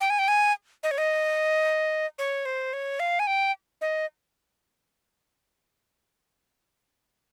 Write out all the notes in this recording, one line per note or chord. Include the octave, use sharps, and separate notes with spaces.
G5
G#5
G5
G#5
D#5
C#5
D#5
C#5
C5
C#5
F5
G#5
G5
D#5